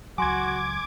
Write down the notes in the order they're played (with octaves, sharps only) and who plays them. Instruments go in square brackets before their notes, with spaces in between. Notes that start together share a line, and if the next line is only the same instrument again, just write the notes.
[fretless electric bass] C#2 F#3 [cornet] F#4 [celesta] G#5 C6 [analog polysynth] D6 G#6